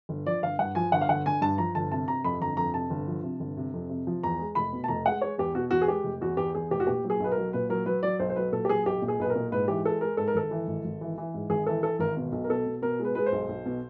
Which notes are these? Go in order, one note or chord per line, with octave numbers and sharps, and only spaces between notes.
G1
F3 D5
G1 F5
G2 F#5
F3 G#5
G1 F#5
F5
G1 F#5
D3 G#5
G2 A5
F3 A#5
G1 A5
C3 A5
C3 A#5
F2 B5
G1 A#5
F2 A#5
C3 A5
G1
F3
C3
G1
C3
F2
C3
F3
E2 A#5
G#3
F1 B5
B2
A5
F1 A#5
G#3 F#5
G#3 C#5
E2 G4
B2 F#4
E2 F#4
G#4
G#3 G4
F1
E2 F#4
E2 G4
E2 G#4
F1 G4
F#4
A#2 G4
F#3
G#4
B1 B4
A#4
F#3
A#2 B4
F#3 A#4
F#3 B4
F#3 D5
B1 C5
C5
F#3 B4
A#2 A4
G4
F#3 G#4
B1 G4
A#2
G#4
B1 B4
A#4
A#2
G#2 B4
E3 G4
G#3 A4
G#3 A#4
G#2 A4
A#4
G#1 A4
E3
G#1
G#1
E3
E3
G#2
G#1 G#4
E3 A4
E3 A4
G#1 A#4
B2
B1
A#4
B2 A4
B2
B2 A#4
G#3
B4
G#3 B4
C5
B1
B1
B2